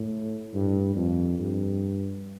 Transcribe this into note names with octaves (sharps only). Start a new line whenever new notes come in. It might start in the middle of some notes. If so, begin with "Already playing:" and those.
Already playing: A2
G2
F2
G2